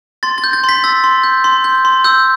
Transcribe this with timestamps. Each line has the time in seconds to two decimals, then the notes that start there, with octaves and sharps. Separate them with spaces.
0.23 C6 A6
0.38 A6
0.44 G6
0.53 A6
0.64 C6 B6
0.84 E6 A6
1.04 C6
1.24 G6
1.44 C6
1.64 G6
1.85 C6
2.04 E6 G6